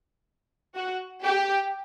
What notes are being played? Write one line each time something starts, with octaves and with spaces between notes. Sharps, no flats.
F#4
G4